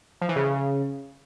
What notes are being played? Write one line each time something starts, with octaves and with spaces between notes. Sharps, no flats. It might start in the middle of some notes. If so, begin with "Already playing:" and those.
F3
E3
C#3